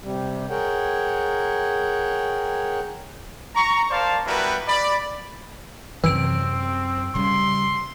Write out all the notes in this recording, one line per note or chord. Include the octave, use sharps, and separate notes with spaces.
C3 G3
G#4 A#4 C#5 F#5 G5
A#5 C#6
A#4 C5 D5 F5 A5
G3 B3 E4 F#4 A#4 B4
D5 B5
F#2 C3 E3 C4 E6 D7
C#3 G3 C6